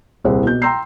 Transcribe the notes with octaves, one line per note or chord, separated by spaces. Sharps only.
D#1 C2 E4 G#4 C5 F#5
B2 G6
G5 A#5 C6 E6 G6 C7